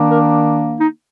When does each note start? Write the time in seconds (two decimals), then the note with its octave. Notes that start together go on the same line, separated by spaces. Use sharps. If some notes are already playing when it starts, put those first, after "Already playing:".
Already playing: D#3 A#3 D4
0.10 A#4
0.79 D#4